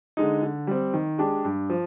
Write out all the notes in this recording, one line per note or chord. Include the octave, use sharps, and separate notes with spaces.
D3 G#3 D#4
D3
G3 C4
D#3
G#3 D4 G4
G2
F3